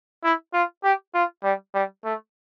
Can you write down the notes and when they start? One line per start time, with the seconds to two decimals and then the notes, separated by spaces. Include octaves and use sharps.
0.24 E4
0.53 F4
0.84 G4
1.14 F4
1.44 G3
1.74 G3
2.05 A3